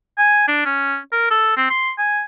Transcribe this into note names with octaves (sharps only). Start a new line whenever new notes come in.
G#5
D4
C#4
A#4
A4
C4
C6
G#5